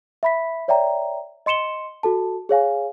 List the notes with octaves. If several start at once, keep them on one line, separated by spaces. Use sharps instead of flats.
E5 B5 B6
C#5 D5 E5 G5 A#5
D#5 C6 C#7 E7 G7
F#4 A4 A5
G#4 C#5 F5 G#5